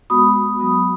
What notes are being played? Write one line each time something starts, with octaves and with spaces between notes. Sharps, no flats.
G#3 B3 F#4 B5 D#6
F#3 B3 F#4